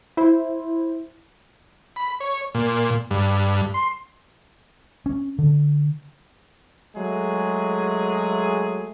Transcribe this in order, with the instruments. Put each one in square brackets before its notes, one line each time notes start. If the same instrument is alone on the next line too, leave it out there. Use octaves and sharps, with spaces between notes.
[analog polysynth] E4 C5
[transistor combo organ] B5
C#5
A#2
G2
C6
[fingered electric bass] C#4
D3
[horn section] F#3 G#3 A3 G#4